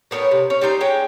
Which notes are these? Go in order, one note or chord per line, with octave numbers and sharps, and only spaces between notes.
A2 B3 A#4 C#5
C3
C#4
G3 D#4 C5 A#5
G#3 C#4 G5